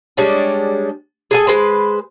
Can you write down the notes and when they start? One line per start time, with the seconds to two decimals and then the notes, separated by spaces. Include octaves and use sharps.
0.17 G3 G#3 C#4 D4
1.31 G#4 A4 G#5
1.47 G#3 B4 C5